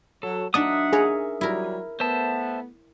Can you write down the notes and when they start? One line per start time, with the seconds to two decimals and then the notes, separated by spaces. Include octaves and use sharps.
0.23 F#3 A4
0.54 F#3 A#3 D4 D#4 D5 E5 F#5 D#6
0.93 G#4 A#4 C#5
1.41 F#3 G3 E4 A#4
2.00 A3 B3 C5 E5 A5